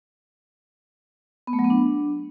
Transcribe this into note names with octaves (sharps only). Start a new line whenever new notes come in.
B3
A3
F#3
B3
D4